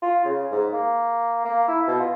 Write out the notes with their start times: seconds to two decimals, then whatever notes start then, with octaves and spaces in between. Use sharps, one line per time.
0.02 F4
0.25 C#3
0.52 G#2
0.73 A#3
1.45 A#3
1.68 E4
1.88 B2
2.00 F4